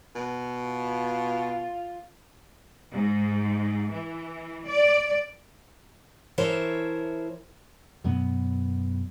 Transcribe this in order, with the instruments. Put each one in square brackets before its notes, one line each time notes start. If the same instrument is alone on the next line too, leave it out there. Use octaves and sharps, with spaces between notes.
[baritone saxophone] B2
[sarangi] F4
[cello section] G#2
E3
D5
[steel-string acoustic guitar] E3 E4 A#4 C5 C#5 A5
[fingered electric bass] F#2 B2 F#3 B3